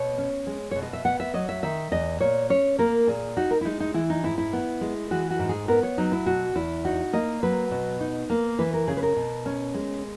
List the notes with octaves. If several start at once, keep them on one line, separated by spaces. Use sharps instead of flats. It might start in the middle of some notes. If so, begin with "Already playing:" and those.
Already playing: B2 C#5
C#4
G#3
B2 C#5
D#5
E5
B3 F#5
E5
F#3 D#5
E5
D#3 E5
E2 D#5
A#2 C#5
C#4 C#5
A#3 A#4
A#2 G#4
D#4 F#4
A#4
E4
G#3 D#4
D#4
E3 E4
D#4
G#2 E4
E4
B3
G#3
E3 F#4
F#4
G#2
G#4
B3 A#4
C#5
F#3 D#4
E4
B2 F#4
E2 E4
D#4 F#4
A#3 D#5
F#3 B4
B2
D#4
A#3
E3 B4
A#4
C#3 G#4
B4
A#4
B2
C#4
G#3